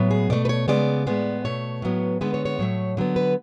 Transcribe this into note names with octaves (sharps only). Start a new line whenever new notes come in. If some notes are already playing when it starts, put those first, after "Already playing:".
Already playing: A2 F#3 B3
G#4
B2 A3 D5
B4
C#5
C#3 G#3 B3 D5
A2 G#3 B3
B2 A3 C#5
A2 F#3 B3
D3 G#3 B3 B4
C#5
C#5
A2 F#3 A3
D3 F#3 B3
B4